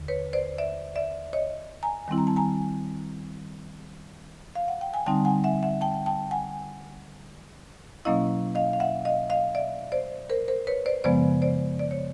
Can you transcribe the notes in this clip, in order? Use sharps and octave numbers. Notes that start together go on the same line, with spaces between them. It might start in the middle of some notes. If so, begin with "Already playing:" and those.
Already playing: D#2 D3
B4 C#5
C5 D5
D5 E5
D5 E5
C#5 D#5
G#5 A#5
D#3 G3 C4 E4
A#5
A5
G#5 A#5
F5
F#5
G5
G#5
D3 G3 C4 D#4 G5 A5
F#5 G#5
E5 F#5
E5 F#5
G5 A5
G5 A5
F#5 G#5
B2 F#3 A#3 C#4 E4 D#5 F5
D#5 F5
F5
E5 F#5
D#5 F5
D#5 F5
D5 E5
C5 D5
A#4 C5
A#4 C5
B4 C#5
C5 D5
F#2 C#3 F3 G#3 B3 C5 D5
C5 D5
D5
C#5